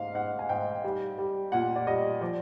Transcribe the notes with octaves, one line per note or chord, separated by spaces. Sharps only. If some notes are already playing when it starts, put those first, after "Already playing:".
Already playing: G#2 F5
G#2 F#5
G#5
G#2 G5
G3
G3
A#2 F#5
D5
G3 D#5
F3 D5